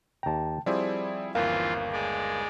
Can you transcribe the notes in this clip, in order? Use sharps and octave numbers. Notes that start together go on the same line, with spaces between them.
D#2 G5 A5 A#5
F3 G3 C4 E4 G#4 D5
G1 D#2 E3 F4 A#4 F5
G#3 D5